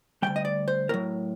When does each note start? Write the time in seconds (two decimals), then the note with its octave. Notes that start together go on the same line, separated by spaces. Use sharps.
0.22 D2 C3 G3 G5
0.36 D#5
0.45 D5
0.68 C5
0.89 A2 F#3 A#4